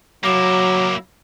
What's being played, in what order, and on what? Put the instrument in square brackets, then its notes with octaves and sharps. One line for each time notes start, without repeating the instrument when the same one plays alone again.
[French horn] F#3 [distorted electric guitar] A#3 E4 [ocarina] D6